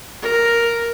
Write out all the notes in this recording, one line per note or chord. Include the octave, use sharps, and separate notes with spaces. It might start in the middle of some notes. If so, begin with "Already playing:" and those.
A#4